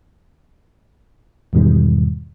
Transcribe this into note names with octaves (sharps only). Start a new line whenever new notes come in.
E2 G#2 B2 D#3 G3